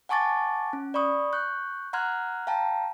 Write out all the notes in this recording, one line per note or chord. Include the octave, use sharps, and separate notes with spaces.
F#5 G#5 A5 C#6 D6 A6
C#4
D5 B5 C#6 D#6
C#6 F#6 G6
F#5 A#5 C6 F6 F#6 G#6
F5 G5 A5 A#5